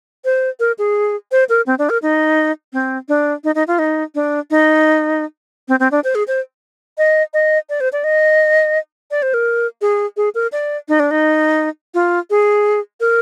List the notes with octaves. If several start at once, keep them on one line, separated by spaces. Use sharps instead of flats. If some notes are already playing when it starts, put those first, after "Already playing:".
C5
A#4
G#4
C5
A#4
C4
D4
A#4
D#4
C4
D4
D#4
D#4
F4
D#4
D4
D#4
C4
C4
D4
C5
G#4
C5
D#5
D#5
D5
C5
D5
D#5
D5
C5
A#4
G#4
G#4
A#4
D5
D#4
D4
D#4
F4
G#4
A#4